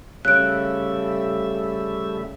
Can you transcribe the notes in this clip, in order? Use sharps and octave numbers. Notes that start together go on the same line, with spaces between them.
C#3 G3 A3 E5 F#6 D7